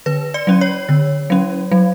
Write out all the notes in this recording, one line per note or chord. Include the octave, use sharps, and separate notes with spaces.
D3 B4
D5
F#3 C#4
C#5
D3
F#3 C#4
F#3